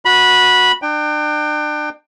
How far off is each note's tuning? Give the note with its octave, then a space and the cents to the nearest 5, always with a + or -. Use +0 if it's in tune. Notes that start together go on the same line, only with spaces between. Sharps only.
F#4 -15 B5 -15
D4 +35 G5 +10